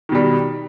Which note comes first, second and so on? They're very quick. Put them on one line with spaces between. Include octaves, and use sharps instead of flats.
D#3 B2 G3